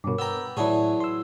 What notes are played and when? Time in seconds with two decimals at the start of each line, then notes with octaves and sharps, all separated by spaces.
0.04 G2 B2 A#4 C#5 D6
0.19 B3 G5 A#5 E6
0.57 A2 E3 F#3 E4 G#4 D5 A5 C#6
1.00 C6 E6